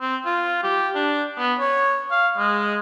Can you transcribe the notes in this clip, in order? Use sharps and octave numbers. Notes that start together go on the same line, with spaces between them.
C4
F4
G4
D4
B3
C#5
F5
G#3